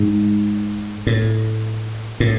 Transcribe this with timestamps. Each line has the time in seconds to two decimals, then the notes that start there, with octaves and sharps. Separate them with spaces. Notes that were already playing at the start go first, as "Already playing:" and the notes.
Already playing: G#2
1.07 A2
2.20 A2